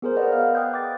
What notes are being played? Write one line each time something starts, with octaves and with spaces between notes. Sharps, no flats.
B3 G#4 A#4 C5
A#4 B4 D5 D#5 F#5
F5 F6
B4 G5 D#6 F#6 G6
D6 A6